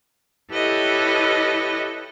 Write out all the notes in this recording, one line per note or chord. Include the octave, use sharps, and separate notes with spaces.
E4 G4 A4 B4 C#5 D#5